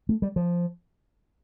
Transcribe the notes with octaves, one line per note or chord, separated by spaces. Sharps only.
A3
G3
F3